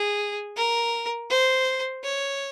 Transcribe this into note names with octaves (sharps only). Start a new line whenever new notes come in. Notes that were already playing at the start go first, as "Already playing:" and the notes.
Already playing: G#4
A#4
C5
C#5